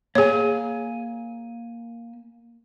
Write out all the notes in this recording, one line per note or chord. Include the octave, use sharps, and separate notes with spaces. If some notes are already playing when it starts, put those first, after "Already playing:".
A#3 G#4 C#5 G#5